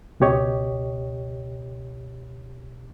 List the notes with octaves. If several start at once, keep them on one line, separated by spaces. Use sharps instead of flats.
C#2 B2 G4 C#5 D#5